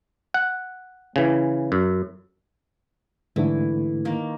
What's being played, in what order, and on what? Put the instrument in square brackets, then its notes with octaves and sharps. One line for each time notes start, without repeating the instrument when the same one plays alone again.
[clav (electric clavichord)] F#5
C#3 E3
F#2
[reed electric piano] G#2 D3 A3 [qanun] E3
[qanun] D#3 A#3